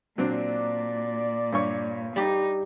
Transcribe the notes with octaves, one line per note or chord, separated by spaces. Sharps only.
A#2 F#3 C4 D4 D5
G2 C#5 C#6
G3 D#4 G4